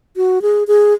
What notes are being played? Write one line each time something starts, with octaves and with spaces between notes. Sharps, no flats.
F#4
G#4
G#4